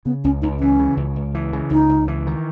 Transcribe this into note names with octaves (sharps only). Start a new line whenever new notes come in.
C#3 B3
C#2 C#4
C#2 D#4
E3 C#4
C#3
C#2
C#2
E3
C#3
C#2 D#4
C#2
E3
D#3